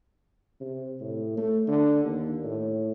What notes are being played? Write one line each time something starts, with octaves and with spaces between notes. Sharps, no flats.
C3
A2
A3
D3
D#2
A2